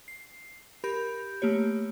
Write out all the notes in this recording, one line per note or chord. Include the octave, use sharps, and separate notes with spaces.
C7
G4 A#4 B5 G6
A3 A#3 G4 C#5